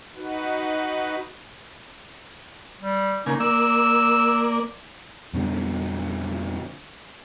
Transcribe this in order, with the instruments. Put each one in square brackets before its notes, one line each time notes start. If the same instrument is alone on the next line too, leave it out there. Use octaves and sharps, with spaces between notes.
[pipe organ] D#4 F#4 B4
[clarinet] G3
[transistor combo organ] C#3 A#3 G#5 [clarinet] D#4
[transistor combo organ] A#3 D5 [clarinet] E6
[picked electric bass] F2 B2 D3 G3